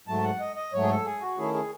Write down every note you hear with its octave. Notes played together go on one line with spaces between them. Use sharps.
G#2 F#3 A3 A5
F#5
D#5
D#5
G#2 F#3 A3 C#5
G#4
A4
G#4
F#4
D#3 A3 C#4 E4 G#4
G#4